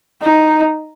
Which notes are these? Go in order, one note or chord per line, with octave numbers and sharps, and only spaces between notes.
D#4